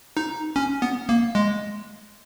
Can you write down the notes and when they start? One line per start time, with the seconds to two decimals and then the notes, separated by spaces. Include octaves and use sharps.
0.17 D#4
0.56 C#4
0.82 B3
1.09 A#3
1.35 G#3